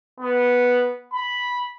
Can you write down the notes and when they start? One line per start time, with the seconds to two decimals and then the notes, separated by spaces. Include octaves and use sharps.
0.20 B3
1.14 B5